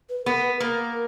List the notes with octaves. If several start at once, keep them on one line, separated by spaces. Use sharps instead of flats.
B4
B3 A#4
B4
A#3 A#4